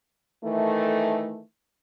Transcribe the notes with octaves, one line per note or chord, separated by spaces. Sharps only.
D#3 E3 A3